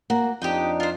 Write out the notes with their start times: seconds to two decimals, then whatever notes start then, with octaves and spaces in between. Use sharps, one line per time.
0.10 A#3 F#4
0.42 F2 D4 D#4 G4 D#5 G5
0.80 F4 C5